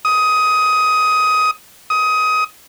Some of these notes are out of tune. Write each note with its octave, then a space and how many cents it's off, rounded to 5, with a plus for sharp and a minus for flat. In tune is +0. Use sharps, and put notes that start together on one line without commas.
D#6 +15
D#6 +20